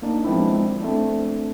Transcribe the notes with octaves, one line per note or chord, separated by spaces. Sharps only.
A#3 D4 D#4
F3 G#3 B3 C4 D4 E4
A3 C4 D4